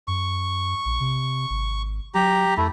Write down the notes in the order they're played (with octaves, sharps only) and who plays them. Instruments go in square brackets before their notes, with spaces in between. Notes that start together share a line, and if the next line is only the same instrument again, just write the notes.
[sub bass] F#2 [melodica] C#6
[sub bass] A#1
C3
G#1
[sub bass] F#3 [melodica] G4 A#5
[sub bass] F2 [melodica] A3 E4